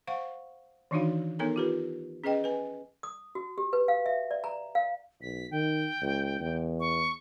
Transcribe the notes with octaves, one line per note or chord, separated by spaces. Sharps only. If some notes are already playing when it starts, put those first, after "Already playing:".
C5 F5 F#5 C#6
D#3 E3 D4 D#4 F#4 F5
B3 D#4 A4 A#4 C#5 A#5
F4 G4 B4
C#4 G#4 B4 D#5 G5
B4 G#5
D#6
F#4
G4
B4
F5
E5
D5
A#5
F5
B1 B6
D#3 G5
C#2
E2
C#6